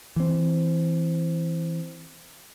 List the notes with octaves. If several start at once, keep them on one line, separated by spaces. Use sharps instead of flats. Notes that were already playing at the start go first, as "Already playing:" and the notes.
E3 C4